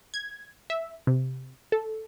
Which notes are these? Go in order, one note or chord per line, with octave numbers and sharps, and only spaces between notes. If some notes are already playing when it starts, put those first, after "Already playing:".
G#6
E5
C3
A4